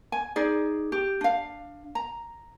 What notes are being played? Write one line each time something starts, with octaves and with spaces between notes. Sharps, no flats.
G#5
D#4 G#4 D5
G4
D4 F5
A#5